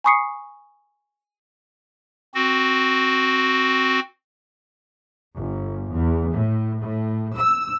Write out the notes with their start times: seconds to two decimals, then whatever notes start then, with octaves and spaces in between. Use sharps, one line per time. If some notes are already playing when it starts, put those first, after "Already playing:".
0.04 G#5 B5 C#6 D#6 C7 C#7
2.34 C4 F#4
5.34 G1
5.92 E2
6.30 A2
6.79 A2
7.35 E6